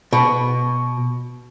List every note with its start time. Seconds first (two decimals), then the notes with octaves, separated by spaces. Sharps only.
0.13 B2